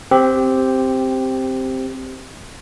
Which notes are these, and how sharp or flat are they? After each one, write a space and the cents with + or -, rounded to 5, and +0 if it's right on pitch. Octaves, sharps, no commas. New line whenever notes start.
C4 +0 G4 +0